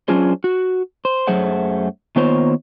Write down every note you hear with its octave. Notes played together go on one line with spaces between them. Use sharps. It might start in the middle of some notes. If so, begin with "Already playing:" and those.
F#3 C#4 D4 F4 G#4 C5
F#4
C5
F#2 F#3 A3 G#4 C5 F#5
D#3 A#3 B3 F4 C5 C#5